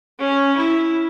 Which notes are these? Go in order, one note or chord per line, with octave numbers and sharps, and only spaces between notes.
C#4
E4